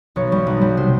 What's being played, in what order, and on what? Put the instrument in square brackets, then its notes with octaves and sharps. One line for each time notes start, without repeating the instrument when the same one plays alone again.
[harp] B1 C#5
G3
B1
G3
C3 C5